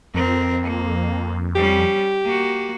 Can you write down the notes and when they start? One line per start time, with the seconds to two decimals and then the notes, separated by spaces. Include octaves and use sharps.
0.14 F2 C4 A#4
0.63 A#3
1.56 G3 C#4 G4
2.25 A#3 F#4